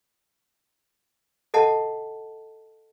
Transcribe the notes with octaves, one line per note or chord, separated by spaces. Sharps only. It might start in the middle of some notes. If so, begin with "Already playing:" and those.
A4 D#5 F#5 A5